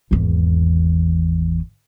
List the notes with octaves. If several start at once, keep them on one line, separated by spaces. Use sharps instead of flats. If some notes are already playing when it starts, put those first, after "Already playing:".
G#1 E2